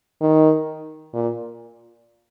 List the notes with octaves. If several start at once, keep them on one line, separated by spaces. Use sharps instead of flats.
D#3
A#2